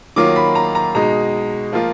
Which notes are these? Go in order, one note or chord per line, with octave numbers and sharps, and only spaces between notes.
D#3 F#3 A#3 F4 D6
B5
A#5
A#5
B2 G#3 D#4 A#5
F3 A#3 F4